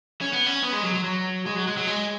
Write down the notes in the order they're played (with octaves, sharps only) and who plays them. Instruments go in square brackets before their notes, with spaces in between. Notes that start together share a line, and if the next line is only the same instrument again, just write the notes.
[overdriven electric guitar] C#4
B3
C#4
B3
G#3
F#3
F#3
F#3
G#3
F#3
G#3
F#3
G#3